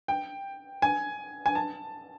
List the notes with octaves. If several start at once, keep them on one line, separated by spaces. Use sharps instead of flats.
G5
G#5
G#5
A5